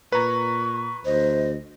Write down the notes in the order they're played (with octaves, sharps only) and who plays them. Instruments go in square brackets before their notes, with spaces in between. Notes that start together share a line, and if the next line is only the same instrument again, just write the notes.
[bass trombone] A#2 [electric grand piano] B4 A#5 [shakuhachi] C#6
[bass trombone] D2 [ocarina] C5 [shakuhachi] D#5